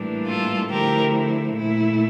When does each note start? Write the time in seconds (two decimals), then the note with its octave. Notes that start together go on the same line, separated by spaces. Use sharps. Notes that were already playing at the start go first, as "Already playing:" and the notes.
Already playing: A2 E3 G3 A#3 D4
0.27 F4 A4
0.70 D3 F3 A3 E4 G4 A#4
1.55 A#2 A3 E4